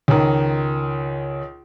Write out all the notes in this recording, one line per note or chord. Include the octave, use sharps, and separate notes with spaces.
C#2 D#3